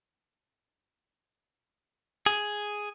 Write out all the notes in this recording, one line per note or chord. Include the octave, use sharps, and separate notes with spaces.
G#4